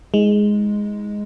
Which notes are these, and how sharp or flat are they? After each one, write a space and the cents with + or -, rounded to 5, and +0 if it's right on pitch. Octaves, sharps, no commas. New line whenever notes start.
G#3 +0 D#4 +35